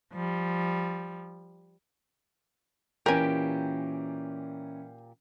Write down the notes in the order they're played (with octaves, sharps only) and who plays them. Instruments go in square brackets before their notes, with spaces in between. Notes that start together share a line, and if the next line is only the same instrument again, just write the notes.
[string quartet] F3 G3
[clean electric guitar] A#2 G4 G5 [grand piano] E3 C#4 [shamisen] A#4 G#5